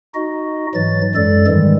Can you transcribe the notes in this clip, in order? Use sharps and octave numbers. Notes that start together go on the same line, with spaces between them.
D#4 F#4 D#5
G#2 E3 F#3 A6
F#2 G#3 A4 D5 A6
G#2 D#3 E3 G3 G#3